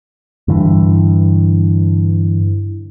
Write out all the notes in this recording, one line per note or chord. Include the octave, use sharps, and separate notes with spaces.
G2 D3 E3